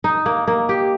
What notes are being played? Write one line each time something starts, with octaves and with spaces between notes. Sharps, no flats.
D#4
A#3
A#3
G4